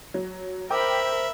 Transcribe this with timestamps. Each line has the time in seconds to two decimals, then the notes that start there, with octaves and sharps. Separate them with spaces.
0.14 F#3
0.70 A#4 C5 E5 G5 B5 D6